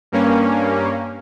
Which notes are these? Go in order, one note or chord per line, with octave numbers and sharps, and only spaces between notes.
G2 A#3 C#4